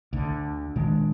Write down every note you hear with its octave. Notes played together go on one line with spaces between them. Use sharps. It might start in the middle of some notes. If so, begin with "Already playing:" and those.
D2 D3
A#2 D#3 G#3 D4